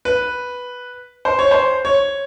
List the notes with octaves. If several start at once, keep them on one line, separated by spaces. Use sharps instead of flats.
B4
C5
C#5
C5
C#5